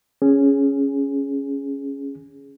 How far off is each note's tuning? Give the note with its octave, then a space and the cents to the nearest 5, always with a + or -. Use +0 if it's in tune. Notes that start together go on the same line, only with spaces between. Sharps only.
C#4 +0 G#4 +0